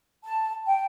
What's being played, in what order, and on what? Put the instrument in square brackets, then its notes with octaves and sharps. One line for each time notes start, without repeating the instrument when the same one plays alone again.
[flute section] A5
G5